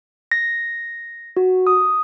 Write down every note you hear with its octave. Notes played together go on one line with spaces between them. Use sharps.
A#6
F#4
D#6